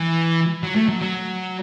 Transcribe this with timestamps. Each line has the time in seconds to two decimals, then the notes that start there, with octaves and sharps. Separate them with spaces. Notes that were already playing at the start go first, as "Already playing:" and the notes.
Already playing: E3
0.63 F#3
0.76 A3
0.89 F#3
1.02 F#3